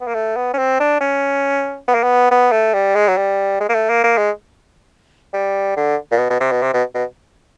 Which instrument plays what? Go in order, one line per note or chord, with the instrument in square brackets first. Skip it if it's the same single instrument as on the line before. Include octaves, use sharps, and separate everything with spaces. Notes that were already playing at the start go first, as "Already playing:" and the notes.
[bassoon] B3
A#3
A3
B3
C#4
C4
D4
C#4
B3
A#3
B3
B3
A3
G3
G#3
F#3
G3
G#3
A#3
A3
A#3
A#3
G#3
G3
D3
A#2
B2
B2
C3
B2
C3
B2
B2